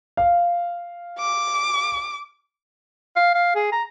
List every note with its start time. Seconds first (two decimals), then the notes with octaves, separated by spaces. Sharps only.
0.17 F5
1.19 D6
3.16 F5
3.35 F5
3.55 G#4
3.72 A#5